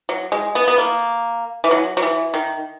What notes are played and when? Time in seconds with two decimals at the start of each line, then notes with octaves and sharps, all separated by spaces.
0.09 F#3
0.32 G#3
0.55 B3
0.68 B3
0.78 A#3
1.64 E3
1.71 F#3
1.97 F#3
2.03 E3
2.34 D#3